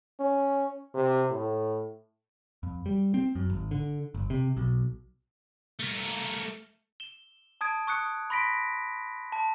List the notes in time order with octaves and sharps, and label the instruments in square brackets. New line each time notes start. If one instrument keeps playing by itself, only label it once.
[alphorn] C#4
C3
A2
[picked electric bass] F2
G3
C4
F#2
G#1
D3
G1
C3
B1
[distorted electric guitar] A3 A#4
[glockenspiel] E7 G7
A5 D#6 G#6 D7
C#6 D#6 F#6 C#7
B5 C6 A#6 B6 D7
A5